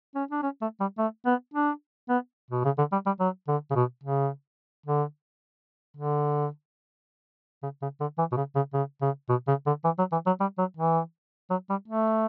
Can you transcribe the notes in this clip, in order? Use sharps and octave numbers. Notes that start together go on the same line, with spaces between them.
C#4
D4
C#4
A3
G3
A3
B3
D4
B3
B2
C#3
D3
G3
G3
F#3
D3
C#3
B2
C#3
D3
D3
C#3
C#3
D3
E3
B2
C#3
C#3
C#3
C#3
B2
C#3
D3
E3
F#3
E3
F#3
G3
F#3
E3
F#3
G3
A3